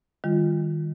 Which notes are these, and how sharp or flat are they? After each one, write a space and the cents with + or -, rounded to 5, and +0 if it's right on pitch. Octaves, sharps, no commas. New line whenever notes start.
D#3 +0 G3 +35 F4 +0